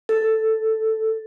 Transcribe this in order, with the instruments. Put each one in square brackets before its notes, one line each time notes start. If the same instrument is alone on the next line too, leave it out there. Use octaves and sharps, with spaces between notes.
[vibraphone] A4